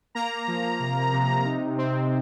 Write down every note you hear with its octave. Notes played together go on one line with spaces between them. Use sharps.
A#3 A#5
F3
C3
C3
D#4
C4